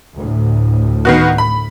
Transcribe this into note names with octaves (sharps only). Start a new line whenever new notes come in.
D2 A2
D#3 B3 F#4
B5